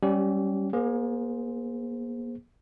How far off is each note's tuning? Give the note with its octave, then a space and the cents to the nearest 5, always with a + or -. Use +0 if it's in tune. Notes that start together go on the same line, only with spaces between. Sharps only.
G3 +0 C#4 +0 G4 -25
A#3 +35 G#4 +0 C5 +0